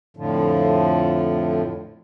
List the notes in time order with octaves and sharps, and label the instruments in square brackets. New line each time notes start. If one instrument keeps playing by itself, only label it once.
[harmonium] F2 A2 D3 F3